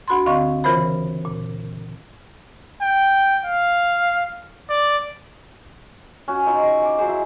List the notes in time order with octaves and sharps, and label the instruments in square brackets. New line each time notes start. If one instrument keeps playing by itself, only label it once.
[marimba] D2 F#4 B5 C6
D3 C4 D#5 F5 C6 C#6
C#3 E3 F4 A#4 C5 B5
A#2
[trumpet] G5
F5
D5
[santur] C#4 F#4
D#4 F4 C#5 E6
D#4 C#6
G#5 D6
F#3 G#4 C5 D#5
E4